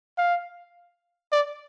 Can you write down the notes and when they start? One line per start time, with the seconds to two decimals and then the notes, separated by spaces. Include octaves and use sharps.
0.18 F5
1.32 D5